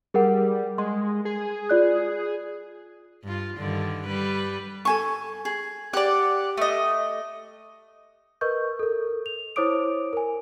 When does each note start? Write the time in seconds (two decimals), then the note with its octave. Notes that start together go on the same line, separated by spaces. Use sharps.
0.14 G3 G#4 A#4 F#5
0.78 G#3 C6
1.25 G#4
1.69 F4 D5 F#6
3.23 G2 F4
3.57 G2 D3 D#3
4.06 G3 B4
4.85 A4 G#5 C#6
5.45 G#4
5.93 G4 D5 F#5
6.57 A3 D#5
8.41 A#4 B4 D#5 C#6 G6
8.79 A4 A#4
9.26 F7
9.56 E4 C5 C#5 D6 D#6 D7
10.13 A#4 G#5